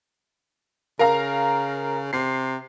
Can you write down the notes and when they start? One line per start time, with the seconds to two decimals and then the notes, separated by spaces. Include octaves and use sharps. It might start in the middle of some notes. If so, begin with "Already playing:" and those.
0.99 C#3 A#4 F5 A#5
2.13 C3 C7